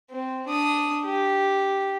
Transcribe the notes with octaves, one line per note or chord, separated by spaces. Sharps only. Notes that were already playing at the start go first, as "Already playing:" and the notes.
C4
D4 D#6
G4